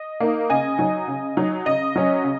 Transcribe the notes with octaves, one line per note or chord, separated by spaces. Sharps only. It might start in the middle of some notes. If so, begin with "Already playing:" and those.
Already playing: D#5
A#3 D#4
C#3 D#5 G#5
F#3 D#4
C#3
F#3 D#4
C#3 D#5
F#3 C#4
C#3